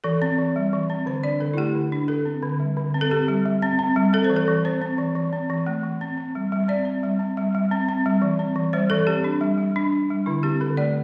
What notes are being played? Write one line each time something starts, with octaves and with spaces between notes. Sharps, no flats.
E3 A4
C4
E3
G3
E3
C4
D3 C5
D4 D5
D3 A4
E4
A3 G4
D3
D4
D3 A4
C4
D3
G3
D3
C4
A4
C4 G4
G3
G3
C4
C4
G3
C4 A4
C5
E3
A4
E3
C4 C5
C4
E3
E3
C4
E3
A3
E3
C4
C4
G3
G3
C4 D5
C4
G3
C4
G3
G3
C4
C4
G3
E3
C4
E3
G3 C5
E3 A4
C4 G4
D4
G3
G3
D4
D4
G3
D3 E4
C4 G4
D3 A4
A3 D5